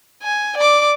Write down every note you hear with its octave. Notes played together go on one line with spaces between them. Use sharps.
G#5
D5 D6